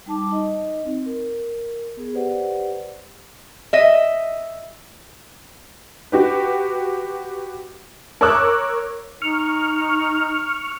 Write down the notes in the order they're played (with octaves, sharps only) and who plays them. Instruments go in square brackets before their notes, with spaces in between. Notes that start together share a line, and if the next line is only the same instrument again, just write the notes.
[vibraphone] G3 D#4 A5 D6
D#4 D#5
C4
A#4
B3 G#4
G4 B4 C5 D5 F#5
[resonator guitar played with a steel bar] D#5 E5
[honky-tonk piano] F#4 G4 B4
A#4 C#5 C#6 D6 E6 F#6
[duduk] D#4 [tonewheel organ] C#6 F6